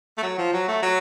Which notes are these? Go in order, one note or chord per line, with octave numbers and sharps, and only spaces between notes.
A3
F#3
F3
F#3
A3
F#3